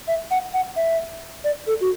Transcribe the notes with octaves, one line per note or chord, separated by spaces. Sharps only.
E5
F#5
F#5
E5
D5
A4
F#4